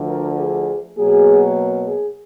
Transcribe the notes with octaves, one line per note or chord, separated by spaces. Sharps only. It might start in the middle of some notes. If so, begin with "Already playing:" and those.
Already playing: D2 D3 F3
A#4
G#4
B2 F#3 A#3 G#4
A#4
G#4